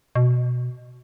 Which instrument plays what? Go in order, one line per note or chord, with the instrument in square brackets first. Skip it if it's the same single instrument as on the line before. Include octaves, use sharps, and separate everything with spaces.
[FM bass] B2